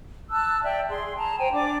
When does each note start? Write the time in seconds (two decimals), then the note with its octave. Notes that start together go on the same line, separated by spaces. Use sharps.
0.30 A5 E6 F#6
0.62 D5 E5 G5
0.88 G#4 C6
1.17 A5 A#5
1.38 C5 G5 G#5 A#5
1.52 D4 D5 D6